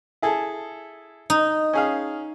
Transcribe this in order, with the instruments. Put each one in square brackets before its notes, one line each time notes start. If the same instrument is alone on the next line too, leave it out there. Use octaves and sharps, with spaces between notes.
[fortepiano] E4 G#4 A4
[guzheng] D#4
[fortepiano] C#4 G#4 F5